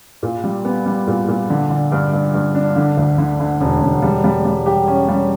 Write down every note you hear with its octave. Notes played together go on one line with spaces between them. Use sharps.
A#2
G3
B3
G3
A#2
A#2
D3
D3
G2
G2
G2
D4
D3
D2
D3
D3
E1
E1
G3
G3
G3
G4
C#4
G3